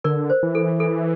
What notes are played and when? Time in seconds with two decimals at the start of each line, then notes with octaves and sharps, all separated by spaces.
0.04 D3 A#4 D5
0.30 C5
0.43 E3
0.55 A4
0.80 A4